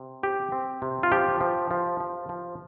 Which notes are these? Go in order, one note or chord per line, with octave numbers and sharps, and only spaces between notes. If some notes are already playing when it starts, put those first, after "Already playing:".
Already playing: C3
C4 G4
C4
C3
F4
F3 G4
F3
F3
F3
F3